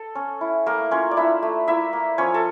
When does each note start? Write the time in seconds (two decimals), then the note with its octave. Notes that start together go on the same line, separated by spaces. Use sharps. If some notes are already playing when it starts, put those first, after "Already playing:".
Already playing: A4
0.15 C#4
0.41 E4
0.66 A3 A#3 A#4
0.91 C#4 F4 C#5
1.11 D5
1.17 D4 E4 E5
1.42 A3
1.68 A#3 E4 E5
1.93 A#3
2.18 F3 C#4 C#5
2.34 A4